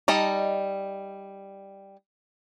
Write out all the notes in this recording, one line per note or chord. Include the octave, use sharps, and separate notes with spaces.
G3 D#4 D#5 A5